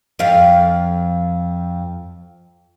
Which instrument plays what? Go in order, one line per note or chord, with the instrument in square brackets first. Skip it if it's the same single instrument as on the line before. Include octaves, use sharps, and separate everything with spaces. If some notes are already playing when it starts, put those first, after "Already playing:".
[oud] F2 F3 F5